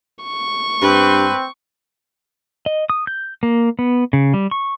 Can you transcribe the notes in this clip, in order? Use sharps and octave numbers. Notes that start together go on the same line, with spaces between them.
C#6
G2 C4 B4
D#5
D#6
G6
A#3
B3
C#3
G3
C#6